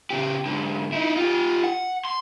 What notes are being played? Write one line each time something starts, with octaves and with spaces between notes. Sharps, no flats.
C#3 G4
G#2 D3
D#4 E4
F4 G4
F#5
C6